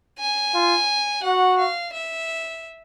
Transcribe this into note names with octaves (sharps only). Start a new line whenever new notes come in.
G#5
F4
F#4 F#5
F5
E5